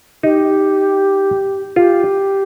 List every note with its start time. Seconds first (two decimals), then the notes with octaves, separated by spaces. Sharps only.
0.23 D#4 G4
1.76 F4 G4